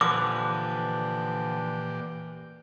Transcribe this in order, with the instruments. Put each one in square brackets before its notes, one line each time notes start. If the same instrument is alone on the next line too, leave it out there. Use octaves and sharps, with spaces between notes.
[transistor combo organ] A#2 G4 D5 [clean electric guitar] D3 F3 B4 [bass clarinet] E3 [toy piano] D6